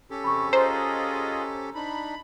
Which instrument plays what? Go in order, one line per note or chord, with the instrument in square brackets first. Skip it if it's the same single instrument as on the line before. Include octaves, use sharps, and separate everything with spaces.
[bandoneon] C#4 G4 A4
[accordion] F2 C#3 C4 [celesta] B5 C#6
[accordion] F4 G#4 D#5 [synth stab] C5 [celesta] A#5
[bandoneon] D4 D#4 [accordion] B5